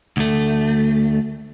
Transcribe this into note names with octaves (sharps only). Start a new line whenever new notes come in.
D2 A3